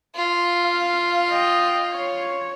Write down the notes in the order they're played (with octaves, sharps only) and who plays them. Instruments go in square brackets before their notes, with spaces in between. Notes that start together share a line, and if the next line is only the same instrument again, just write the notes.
[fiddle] F4
[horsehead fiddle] F5
D#5 G5
C#5